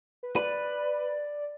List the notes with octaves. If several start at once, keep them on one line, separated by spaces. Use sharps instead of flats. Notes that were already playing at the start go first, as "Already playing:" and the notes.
B4
B4 D5